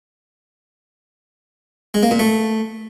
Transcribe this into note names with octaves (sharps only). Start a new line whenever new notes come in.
G#3
A#3
A#2
A3